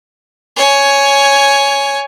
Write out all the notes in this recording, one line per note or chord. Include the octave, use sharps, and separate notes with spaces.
C#5 G#5